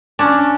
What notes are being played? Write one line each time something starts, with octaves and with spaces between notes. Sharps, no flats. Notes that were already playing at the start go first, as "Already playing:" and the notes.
C#4 D4